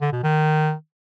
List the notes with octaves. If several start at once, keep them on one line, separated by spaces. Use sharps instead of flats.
D3
B2
D#3